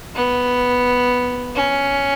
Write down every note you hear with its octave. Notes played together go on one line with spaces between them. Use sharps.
B3
C#4